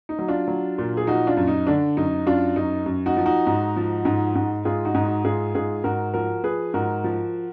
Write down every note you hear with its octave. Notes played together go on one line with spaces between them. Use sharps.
D#4
F#3
D4 F4
F#3
A#2
G#4
F3 D#4 F#4
D4 F4
F#2
D#4
D3 D4
F#2 D#4
F#2 D4 F4
F#2 D#4
F#2
D#4 F#4
F3
D#4 F#4
G#2
F3
G#2
G#2
G#2 F4 G#4
D#4 F#4
G#2
D#4 F#4
G#2 F4 G#4
G#2 F4 G#4
G#2 F#4 A#4
F3 F#4 A#4
F3 G#4 B4
G#2 F#4 A#4
F3